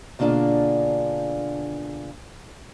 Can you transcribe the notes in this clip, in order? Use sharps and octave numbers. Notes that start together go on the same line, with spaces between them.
B2 D3 A#3 D4 F4 G#4